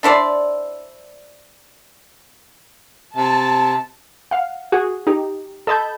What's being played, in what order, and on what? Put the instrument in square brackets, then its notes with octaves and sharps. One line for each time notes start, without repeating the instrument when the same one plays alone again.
[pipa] D4 E4 C5 D5
[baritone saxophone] C3 [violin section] A5
[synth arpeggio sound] F5 F#5
F#4 G#4
D#4 G4
A4 D#5 A5 B5 G6